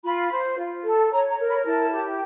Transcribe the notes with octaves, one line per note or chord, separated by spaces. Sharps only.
F4 B5
C5
F4
A4
C#5 A#5
A#5
A#4
B5
E4 A5
G4